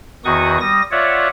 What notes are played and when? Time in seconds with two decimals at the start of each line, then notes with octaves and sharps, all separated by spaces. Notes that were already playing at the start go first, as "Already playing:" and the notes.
0.25 E2 D#3 F#4 C#6 D#6
0.61 G3 D#6 A#6
0.91 F4 C#5 D5 E5 F#5